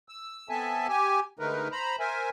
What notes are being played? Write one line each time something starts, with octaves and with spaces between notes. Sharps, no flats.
E6
B3 C4 A4 E5 G#5 A5
G4 G#5
D3 G#3 A3 D#4 A#4 B4
C5 A#5 B5
A#4 C5 E5 G#5